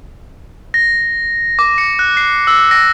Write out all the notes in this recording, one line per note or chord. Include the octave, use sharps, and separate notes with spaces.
A#6
D6
C#7
F#6
C7
E6
A#6